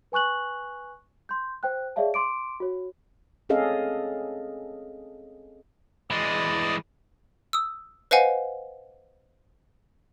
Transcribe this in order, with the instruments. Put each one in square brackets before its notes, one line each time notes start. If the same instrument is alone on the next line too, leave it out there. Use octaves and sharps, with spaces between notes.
[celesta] B4 G#5 C#6 F#6 F#7
C6 G6
C5 G5 F#6
G#4 C#5 D5 E5 F5 A5
C6 D6 D7
F#4 C#5
[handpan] C4 C#4 G#4 A4 D#5 F5
[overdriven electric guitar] E3 G#3 [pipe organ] D5 D#5
[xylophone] D#6 E6
B4 C5 D#5 F5 F#5 G#5